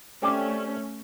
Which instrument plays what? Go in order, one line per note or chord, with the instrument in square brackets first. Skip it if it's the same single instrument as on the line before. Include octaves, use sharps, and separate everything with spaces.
[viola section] A3 C#4 [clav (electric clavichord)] C4 G4 D5